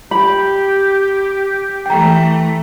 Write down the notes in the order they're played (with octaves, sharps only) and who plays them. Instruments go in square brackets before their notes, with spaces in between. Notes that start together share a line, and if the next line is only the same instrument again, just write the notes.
[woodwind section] G4 [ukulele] B5
[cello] E3 A3 [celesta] G5 A#5